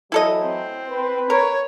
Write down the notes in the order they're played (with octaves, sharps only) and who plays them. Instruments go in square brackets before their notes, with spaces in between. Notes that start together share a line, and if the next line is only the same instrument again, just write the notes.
[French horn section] A2 E3 F#3 [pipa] E4 A4 D#5
[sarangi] C4
[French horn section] B4
[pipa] A#4 [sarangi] C#5